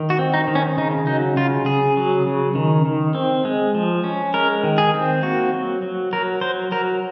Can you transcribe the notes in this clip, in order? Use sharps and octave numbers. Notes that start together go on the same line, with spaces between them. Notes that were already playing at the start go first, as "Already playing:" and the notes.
Already playing: D#3
F#4
C4
D#4
D#3
C#4
C#3 D#4
F#3 D#4
C#3 F4
C#3 G#4
F#3
C#3
D#3
D#3
C4
G#3
F3
C#4
G#3 A#4
D#3
G#4
C4
A#3 F#4
F#3
F#3
F#3 A#4
F#3 C5
F#3 A#4